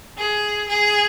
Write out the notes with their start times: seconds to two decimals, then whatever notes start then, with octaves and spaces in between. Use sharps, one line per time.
0.18 G#4
0.69 G#4